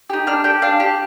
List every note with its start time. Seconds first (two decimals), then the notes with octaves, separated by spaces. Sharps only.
0.10 D#4 G4
0.27 D4 F6
0.44 G4 G5
0.62 D4 F5
0.80 G4